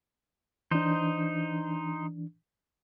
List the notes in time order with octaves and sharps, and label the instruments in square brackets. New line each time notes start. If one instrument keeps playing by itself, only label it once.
[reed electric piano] E3 D4 [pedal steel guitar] D#4 C5